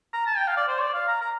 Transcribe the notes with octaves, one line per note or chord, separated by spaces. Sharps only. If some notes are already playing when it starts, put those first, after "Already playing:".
A#5
A5
G5
F5
D5
C5
D5
F5
A#5
A#5